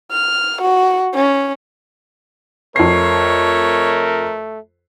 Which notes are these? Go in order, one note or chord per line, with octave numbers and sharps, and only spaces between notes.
F6
F#4
C#4
F2 A3 A#4 C#5 C7